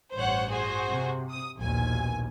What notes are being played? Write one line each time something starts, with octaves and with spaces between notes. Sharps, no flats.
A1 G2 C5 C#5 F#5
F#4 G#4 C5
C3
D#6
A#1 D#2 B2 G#5